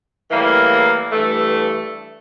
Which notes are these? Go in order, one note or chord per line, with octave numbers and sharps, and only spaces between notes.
A2 E3 G3 A#3
G2 E3 A3